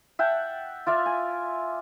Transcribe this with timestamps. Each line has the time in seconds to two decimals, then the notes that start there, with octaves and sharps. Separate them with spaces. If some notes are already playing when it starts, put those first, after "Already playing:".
0.19 E5 F#5 G5 A5
0.86 F4 D5 E5 F5
1.06 G#5